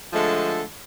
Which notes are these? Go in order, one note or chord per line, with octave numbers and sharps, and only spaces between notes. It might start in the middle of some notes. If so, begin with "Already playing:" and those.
D3 F3 G#3 A3 A4